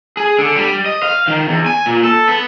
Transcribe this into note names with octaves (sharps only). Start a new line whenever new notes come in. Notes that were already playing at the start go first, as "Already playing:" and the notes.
G#4
D3
G3
D#5
F5
D#3
E2
G#5
A#2
A4
B3